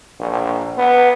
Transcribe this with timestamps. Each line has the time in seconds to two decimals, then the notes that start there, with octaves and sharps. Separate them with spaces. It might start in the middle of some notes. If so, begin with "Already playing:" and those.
0.20 A#1
0.77 B3